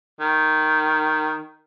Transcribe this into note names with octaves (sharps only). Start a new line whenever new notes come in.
D#3